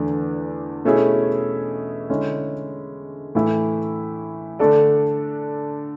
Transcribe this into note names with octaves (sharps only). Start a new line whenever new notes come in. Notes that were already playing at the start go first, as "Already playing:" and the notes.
Already playing: E2 D3 A3 D4
B2 A3 C#4 E4 G#4
D3 G#3 C#4 E4
A2 E3 A3 E4
D3 A3 D4 A4 D5